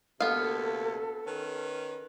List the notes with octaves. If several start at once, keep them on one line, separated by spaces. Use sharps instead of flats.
D2 C3 A#3 B3 A4 F5
D#3 C#4 B4